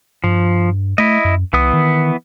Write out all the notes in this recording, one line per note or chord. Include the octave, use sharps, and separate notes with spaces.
G2 F3
A3 E4 D#5
F#2
C2 E3 B3 D#6
D#3